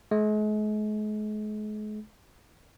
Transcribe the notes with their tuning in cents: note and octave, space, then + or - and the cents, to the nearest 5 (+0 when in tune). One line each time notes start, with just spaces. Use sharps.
G#3 +40